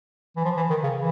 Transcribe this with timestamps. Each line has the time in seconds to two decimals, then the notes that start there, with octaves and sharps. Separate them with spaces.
0.37 E3
0.45 F3
0.57 E3
0.70 D#3
0.83 C#3
0.96 E3